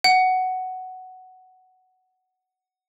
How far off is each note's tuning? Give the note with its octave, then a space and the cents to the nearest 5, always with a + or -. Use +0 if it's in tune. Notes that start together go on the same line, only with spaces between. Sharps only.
F#5 +5